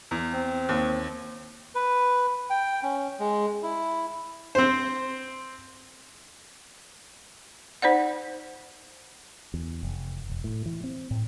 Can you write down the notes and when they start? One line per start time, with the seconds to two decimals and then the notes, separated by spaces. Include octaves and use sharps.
0.11 E2
0.33 C4
0.69 D#2
1.75 B4
2.50 G5
2.83 C#4
3.20 G#3
3.63 E4
4.55 C4 C5
7.82 D#4 C5 D5 F#5
9.54 E2
9.83 F1
10.30 E1
10.44 A2
10.66 E3
10.84 C4
11.11 A2